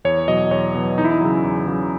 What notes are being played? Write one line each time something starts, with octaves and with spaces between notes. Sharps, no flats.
E2 C#5
B2 F#3 D#5
E2 C#5
B2 F#3
E2 D#4
E4
D#4
C#3 F#3
E2
C#3 F#3